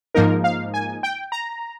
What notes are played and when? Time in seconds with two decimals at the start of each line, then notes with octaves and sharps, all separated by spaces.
0.15 G#2 F3 A#3 D#4 A#4
0.44 F5
0.74 G#5
1.03 G5
1.32 A#5